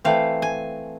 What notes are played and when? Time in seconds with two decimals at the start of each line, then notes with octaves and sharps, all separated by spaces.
0.05 E3 A3 C4 F5
0.42 G#5